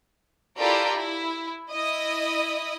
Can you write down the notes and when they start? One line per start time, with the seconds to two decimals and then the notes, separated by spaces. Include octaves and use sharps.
0.57 E4 F4 G4 A4 A#4 D5
0.96 E4
1.71 E4 D#5 D#6